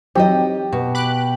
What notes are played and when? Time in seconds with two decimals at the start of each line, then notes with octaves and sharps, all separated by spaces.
0.15 E3 F#3 C4 D#4 G4 A4 D#5
0.72 B2
0.95 B5 D6 F#6